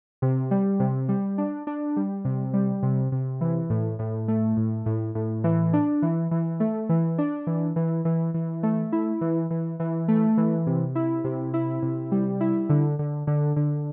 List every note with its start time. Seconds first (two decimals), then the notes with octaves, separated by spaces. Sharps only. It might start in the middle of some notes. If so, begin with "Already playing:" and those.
0.22 C3
0.51 G3
0.80 C3
1.09 G3
1.38 D4
1.67 D4
1.97 G3
2.25 C3
2.54 G3
2.83 C3
3.12 C3
3.41 E3
3.70 A2
3.99 A2
4.28 A3
4.57 A2
4.86 A2
5.15 A2
5.44 E3
5.73 D4
6.02 E3
6.31 E3
6.60 A3
6.89 E3
7.18 D4
7.47 E3
7.76 E3
8.05 E3
8.34 E3
8.63 A3
8.92 E4
9.21 E3
9.51 E3
9.80 E3
10.08 A3
10.37 E3
10.67 C3
10.95 E4
11.24 C3
11.54 E4
11.82 C3
12.12 G3
12.40 E4
12.69 D3
12.99 D3
13.27 D3
13.56 D3